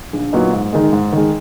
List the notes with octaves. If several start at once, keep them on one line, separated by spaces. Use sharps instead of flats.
A#1
A#2 F#3 B3 D#4
G#2
D#3 G#3
G#2
D#3 G#3